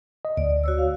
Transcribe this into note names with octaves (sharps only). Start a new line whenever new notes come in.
D#5
D2 D5
F#4 C#5 E6
F5